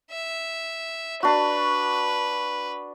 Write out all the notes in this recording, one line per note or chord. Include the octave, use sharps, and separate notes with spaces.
E5
D4 F#4 B4